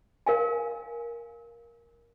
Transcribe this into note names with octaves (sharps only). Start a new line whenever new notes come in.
A#4 F5 G#5